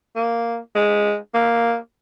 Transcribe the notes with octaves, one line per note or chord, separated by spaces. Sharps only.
A#3
G#3
A#3